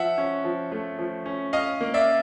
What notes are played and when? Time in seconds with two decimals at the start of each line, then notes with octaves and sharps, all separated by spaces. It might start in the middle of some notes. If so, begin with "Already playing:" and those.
Already playing: F3 E5 F#5
0.18 C#4
0.44 F3
0.72 A3
0.99 F3
1.26 C#4
1.53 C#4 D#5 F5
1.81 A#3
1.94 D5 E5